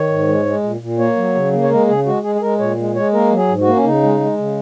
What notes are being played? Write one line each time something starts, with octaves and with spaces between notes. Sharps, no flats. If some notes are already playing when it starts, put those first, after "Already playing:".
Already playing: D#3 C#5
G#2
G#3
G#3
A#2
A#2
A#3 C#5
F#3
C#3
A#3
C#5
G#3 A#4
C#3 G#4
G#3 F#4
G#3 G#4
G#4
G#3 A#4
A#2 C#5
G#3
G#3 C#5
A#3 A#4
F#3
G#4
G#2
F#4
A#3
C#4
C#3 D#4
G#3
G#3
C#3